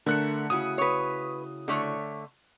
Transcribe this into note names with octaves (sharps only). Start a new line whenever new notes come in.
D3 A3 A4 A#4 F#6 C#7
C#3 E4 F#4 D#6
B4 C#5
D3 A3 C#5